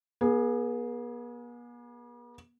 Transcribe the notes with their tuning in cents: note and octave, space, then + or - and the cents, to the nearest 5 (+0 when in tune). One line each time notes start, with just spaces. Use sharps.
B3 -45 G#4 +5